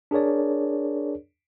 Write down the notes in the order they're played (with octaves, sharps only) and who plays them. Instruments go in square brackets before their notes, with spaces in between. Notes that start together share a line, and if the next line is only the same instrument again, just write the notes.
[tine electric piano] D4 G#4 A#4 C#5 D5